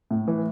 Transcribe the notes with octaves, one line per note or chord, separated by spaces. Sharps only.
A2
E3